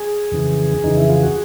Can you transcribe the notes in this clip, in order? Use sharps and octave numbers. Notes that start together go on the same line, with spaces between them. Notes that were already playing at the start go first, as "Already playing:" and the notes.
Already playing: G#4
F2 C#3 E3
F2 C#3 E3 D#4
E4
F4
F#4